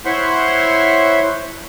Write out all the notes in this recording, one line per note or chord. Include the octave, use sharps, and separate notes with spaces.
E4 C5 C#5 E5 F#5 C6